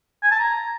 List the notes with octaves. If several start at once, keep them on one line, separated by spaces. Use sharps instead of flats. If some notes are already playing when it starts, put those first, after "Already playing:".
G#5
A5
A#5